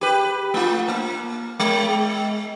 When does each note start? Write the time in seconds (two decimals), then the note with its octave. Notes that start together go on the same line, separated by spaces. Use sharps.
0.01 G4 B4
0.54 A3 F4
0.88 A#3
1.60 G#3